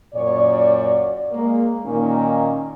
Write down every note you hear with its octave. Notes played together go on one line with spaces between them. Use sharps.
F#2 A#2 C#5 D5
G#3 A#3
A#2 D#3 A#3 C#4 D#4